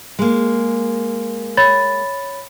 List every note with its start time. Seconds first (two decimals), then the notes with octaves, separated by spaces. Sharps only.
0.19 G#3 A#3
1.57 C#5 B5 A6